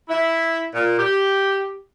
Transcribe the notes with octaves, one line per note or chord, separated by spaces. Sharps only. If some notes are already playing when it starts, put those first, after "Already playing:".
E4
A#2
G4